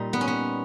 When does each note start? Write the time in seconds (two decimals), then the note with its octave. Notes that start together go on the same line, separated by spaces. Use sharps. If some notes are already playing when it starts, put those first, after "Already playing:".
Already playing: A#2 G3 D#4
0.13 B3
0.21 C#4
0.28 B3